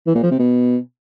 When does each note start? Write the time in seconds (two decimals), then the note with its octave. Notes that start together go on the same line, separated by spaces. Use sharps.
0.07 E3
0.15 A#2
0.23 F3
0.31 C3
0.39 B2